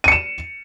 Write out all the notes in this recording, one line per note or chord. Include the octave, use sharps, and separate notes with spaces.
C#7 D#7 E7